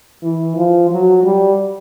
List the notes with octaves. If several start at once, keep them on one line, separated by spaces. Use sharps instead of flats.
E3
F3
F#3
G3